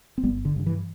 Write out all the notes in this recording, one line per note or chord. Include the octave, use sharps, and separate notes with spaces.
C4
G1 G3 B3
D3
G2 D3
E3